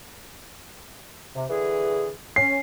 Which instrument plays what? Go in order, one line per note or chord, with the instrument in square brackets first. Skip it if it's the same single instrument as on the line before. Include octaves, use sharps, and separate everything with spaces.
[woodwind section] C3
D3 E3 G#4
[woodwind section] C#4 [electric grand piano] C7